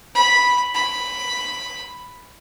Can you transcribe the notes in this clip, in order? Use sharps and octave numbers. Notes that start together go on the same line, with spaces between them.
B5
B5